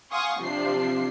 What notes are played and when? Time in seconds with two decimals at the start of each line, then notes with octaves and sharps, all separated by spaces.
0.12 F5 F#5 G#5 C6 C#6 D#6
0.40 C3 F3 D4 C7